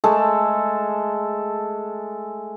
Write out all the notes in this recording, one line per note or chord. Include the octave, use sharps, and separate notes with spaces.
G#3 A3 A4